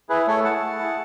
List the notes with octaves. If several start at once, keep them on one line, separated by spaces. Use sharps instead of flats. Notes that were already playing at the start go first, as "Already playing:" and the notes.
E4 G#4 B4
A3 A4 C#5
E4 G#4 F#5 A5
A3
E4 G#4